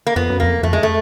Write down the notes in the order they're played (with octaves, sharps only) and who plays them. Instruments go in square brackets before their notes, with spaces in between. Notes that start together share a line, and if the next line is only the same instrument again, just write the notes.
[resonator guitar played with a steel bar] A#3
[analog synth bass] F2 [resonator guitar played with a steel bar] B3
[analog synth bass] F#2
[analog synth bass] F2 [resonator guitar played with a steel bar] A#3
[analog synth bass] F2 [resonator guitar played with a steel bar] A3
[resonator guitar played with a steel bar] G#3
A3